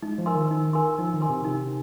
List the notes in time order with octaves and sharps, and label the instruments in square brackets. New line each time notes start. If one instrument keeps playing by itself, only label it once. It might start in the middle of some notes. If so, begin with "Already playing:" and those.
[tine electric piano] G#3 [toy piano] D#4
[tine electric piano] F3
[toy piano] A#4 G#5 C6
[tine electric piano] D#3
[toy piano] D#4
A#4 G#5 C6
[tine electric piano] F3 [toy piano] D#4
[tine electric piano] D#3
[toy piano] A#4 G#5 C6
[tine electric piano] C3
[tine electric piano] C3 [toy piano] D#4